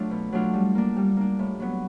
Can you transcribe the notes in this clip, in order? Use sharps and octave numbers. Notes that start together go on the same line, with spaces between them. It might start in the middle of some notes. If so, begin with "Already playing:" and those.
Already playing: F#3 A3 D4 F4
B2
F#3 A3 D4 F4
G3
A#3 D4
G3
A#3 D4
A2
F#3 B3